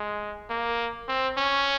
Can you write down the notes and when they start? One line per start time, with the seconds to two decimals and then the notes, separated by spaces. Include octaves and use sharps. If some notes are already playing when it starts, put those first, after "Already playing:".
Already playing: G#3
0.50 A#3
1.08 C4
1.37 C#4